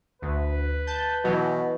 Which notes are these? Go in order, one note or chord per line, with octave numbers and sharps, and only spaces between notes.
D2 B4
A5 G6
B2 E3 F#3